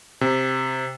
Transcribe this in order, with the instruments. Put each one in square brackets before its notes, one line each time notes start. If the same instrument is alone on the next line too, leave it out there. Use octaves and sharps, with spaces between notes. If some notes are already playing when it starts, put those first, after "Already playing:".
[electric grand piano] C3